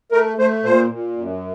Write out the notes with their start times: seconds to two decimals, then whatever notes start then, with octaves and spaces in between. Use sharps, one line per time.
0.12 A3 A#4
0.38 A3 C5
0.64 A#2 C5
0.91 A#2
1.16 F#2